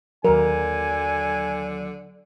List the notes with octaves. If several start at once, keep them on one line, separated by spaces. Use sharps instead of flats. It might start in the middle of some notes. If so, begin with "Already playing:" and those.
D#2 D3 F#3 A#4 G#5